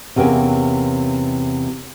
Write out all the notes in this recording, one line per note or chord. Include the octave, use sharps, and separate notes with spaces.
E2 C3 A#3 C#4 G5